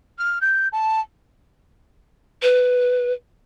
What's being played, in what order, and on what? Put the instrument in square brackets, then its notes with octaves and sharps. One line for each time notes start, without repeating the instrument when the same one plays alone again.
[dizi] F6
G6
A5
[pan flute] B4